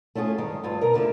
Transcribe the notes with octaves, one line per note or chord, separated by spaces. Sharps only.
A3 C#4 F4 G4 G#4
G2 D#3 G#3
D2 G2 F4
B2 A#4 A#5
A2 D3 F4 E5